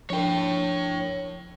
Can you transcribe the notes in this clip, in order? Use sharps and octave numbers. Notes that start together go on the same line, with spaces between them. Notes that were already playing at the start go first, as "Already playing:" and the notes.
F3 D4 A#4 C#5 G5